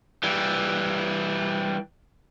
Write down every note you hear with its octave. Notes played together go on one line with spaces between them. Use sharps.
E3 G3